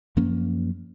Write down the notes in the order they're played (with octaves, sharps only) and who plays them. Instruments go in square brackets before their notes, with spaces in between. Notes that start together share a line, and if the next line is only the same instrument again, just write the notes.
[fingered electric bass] F#2 F3 A#3 C#4